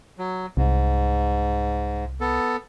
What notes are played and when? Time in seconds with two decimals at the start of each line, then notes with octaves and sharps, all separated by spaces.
0.19 F#3
0.57 C2 G#2
2.21 B3 A4